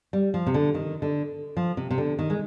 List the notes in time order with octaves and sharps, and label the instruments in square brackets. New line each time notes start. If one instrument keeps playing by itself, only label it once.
[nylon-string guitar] G3
F3
C3
D3
D#3
D3
F3
C3
C3
D3
D#3
G#3